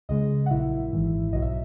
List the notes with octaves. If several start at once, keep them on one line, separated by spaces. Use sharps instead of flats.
C#2 C#3 G#3 D#5
F#5
A#1 A#2 F#3 E4 E5
G#1 G#2 E3
B1 B2 F#3 D#5
E5